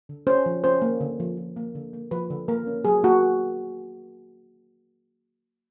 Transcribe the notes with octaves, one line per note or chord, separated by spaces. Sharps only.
D3
C#4 C5
F3
C#4 C5
A#3
D3
F3
F3
A#3
D3
A#3
F3 B4
D3
A#3 A#4
C#4
F#3 G#4
A#3 F#4